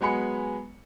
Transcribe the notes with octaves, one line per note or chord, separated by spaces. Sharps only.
F#3 G#3 B3 G#5 B5 C#7